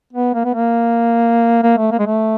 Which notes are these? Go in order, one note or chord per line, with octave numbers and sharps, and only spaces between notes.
B3
A#3
B3
A#3
A#3
A3
A#3
G#3
A3